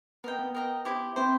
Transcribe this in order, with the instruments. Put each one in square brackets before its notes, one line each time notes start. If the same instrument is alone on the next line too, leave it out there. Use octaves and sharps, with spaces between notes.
[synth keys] B3 [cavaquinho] A#4 D#5 G5
[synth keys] B3
[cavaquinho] A#4 D#5 G5
E4 G4 C5
[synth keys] C4 [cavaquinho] E4 G4 C5